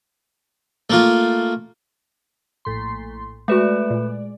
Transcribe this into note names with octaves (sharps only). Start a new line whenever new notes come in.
A3 A#3 F4
A#1 A2 C6
G#3 A3 F#4 B4 D5 E5
A#2